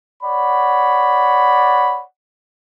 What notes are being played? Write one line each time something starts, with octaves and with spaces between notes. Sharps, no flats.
C#5 D5 F#5 B5